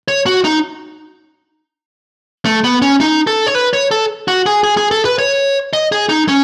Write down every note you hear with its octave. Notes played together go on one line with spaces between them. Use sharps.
C#5
F#4
D#4
A3
B3
C#4
D#4
A4
C#5
B4
C#5
A4
F#4
G#4
G#4
G#4
A4
B4
C#5
D#5
G#4
D#4
C#4